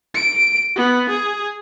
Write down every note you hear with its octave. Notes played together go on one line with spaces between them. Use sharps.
D7
B3
G#4